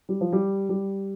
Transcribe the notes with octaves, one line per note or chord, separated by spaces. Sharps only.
G3
F3
G3
G3